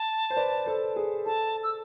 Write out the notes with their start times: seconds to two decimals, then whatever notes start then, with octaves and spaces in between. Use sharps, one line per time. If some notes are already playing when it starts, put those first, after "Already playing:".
Already playing: A5
0.30 C5
0.37 B4 D5
0.66 A4 C5
0.96 G#4
1.26 A4 A5
1.63 E6